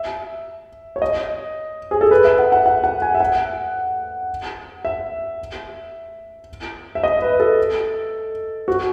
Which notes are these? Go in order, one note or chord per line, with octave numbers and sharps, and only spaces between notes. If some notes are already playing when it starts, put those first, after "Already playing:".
Already playing: E5
C#5
D#5
G#4
A4
B4
E5
F#5
F#5
F#5
F#5
G#5
E5
F#5
E5
E5
D#5
B4
A4
F#4